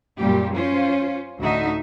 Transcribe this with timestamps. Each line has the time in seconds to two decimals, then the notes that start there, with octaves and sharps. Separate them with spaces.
0.18 F#2 A#2 G3 G4
0.53 C#4 F4 C5
1.40 D2 A2 D3 D#4 F#4 E5